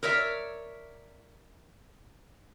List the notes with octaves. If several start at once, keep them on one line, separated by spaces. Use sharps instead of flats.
A#4 C#5 D5 E5